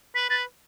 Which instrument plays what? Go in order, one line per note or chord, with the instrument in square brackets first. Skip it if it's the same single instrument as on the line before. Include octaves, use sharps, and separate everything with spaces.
[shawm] B4 [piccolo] B6
[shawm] B4 [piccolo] A6